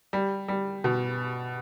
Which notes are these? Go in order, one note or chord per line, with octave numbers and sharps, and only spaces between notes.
G3
G3
B2